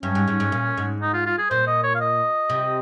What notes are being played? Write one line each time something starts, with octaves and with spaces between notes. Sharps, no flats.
G2 C#4
G#2
G#2
G#2
A#2
G#2
D#4
F4
F4
G#4
A#2 C5
D#5
C#5
F5
D#5
C3